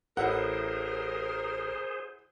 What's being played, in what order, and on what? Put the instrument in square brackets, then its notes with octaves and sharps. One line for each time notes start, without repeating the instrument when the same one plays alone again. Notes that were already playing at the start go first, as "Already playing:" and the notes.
[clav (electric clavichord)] A1 [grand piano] E4 F#5 [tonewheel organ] G#4 C5 [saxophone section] A#4